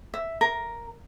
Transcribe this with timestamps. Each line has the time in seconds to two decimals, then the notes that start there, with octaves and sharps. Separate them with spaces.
0.14 E5
0.41 A#4